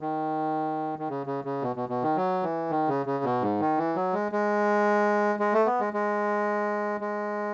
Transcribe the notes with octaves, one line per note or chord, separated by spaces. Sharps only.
D#3
D#3
C#3
C#3
C#3
B2
B2
B2
D#3
F#3
E3
D#3
C#3
C#3
B2
G#2
D#3
E3
F#3
G#3
G#3
G#3
A3
B3
G#3
G#3
G#3